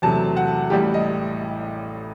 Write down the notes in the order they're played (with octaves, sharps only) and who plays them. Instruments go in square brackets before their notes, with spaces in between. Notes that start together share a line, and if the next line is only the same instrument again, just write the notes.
[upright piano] E2 C3 F#3 A3 A5
F#5
A1 A2 G3 G4
D#5